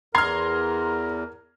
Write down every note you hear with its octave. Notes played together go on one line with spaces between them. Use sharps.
E2 A#4 A#5 C6 F6 G#6 C7